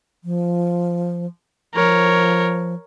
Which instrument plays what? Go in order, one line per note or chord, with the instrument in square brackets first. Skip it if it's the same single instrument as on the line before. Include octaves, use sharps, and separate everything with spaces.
[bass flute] F3
[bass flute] F3 [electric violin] A#4 C#5